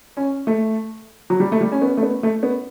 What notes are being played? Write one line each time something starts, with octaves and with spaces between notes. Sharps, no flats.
C#4
A3
F#3
G3
A3
G3
C#4
B3
A3
B3
A3
B3